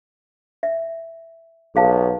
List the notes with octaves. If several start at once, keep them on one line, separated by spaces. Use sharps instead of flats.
E5
B1 G#4 F5 A5